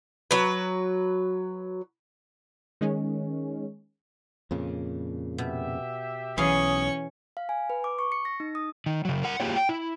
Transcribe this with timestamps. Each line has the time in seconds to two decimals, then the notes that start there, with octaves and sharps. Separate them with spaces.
0.31 F#3 B4
2.81 D#3 G#3 C#4
4.51 F2 A#2 C#3
5.38 B2 G4 E5
6.38 B1 E3 C#4 G#4 F5 C#6 D#6
7.37 F5
7.49 G#5
7.70 B4
7.84 D6
7.99 C#6
8.12 C#7
8.25 A#6
8.40 D#4
8.55 D#6
8.86 D#3
9.05 C#3 F#3
9.23 A#4 F#5
9.40 A#3 F4 G4 G#4 C#5
9.56 G5
9.69 E4